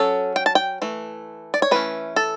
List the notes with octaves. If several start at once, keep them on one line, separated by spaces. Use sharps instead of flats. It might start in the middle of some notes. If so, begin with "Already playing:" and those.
Already playing: F#3 C#4 A4
G5
A5
G5
E3 A3
D5
C#5
E3 A3 C#4 B4
A4